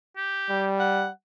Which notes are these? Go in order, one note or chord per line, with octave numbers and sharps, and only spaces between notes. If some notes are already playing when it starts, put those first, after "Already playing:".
G4
G3
F#5